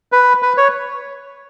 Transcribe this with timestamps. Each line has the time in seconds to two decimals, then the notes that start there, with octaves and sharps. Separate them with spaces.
0.12 B4
0.42 B4
0.57 C#5